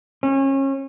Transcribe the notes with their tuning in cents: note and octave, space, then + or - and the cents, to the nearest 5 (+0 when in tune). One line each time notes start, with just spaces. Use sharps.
C#4 -30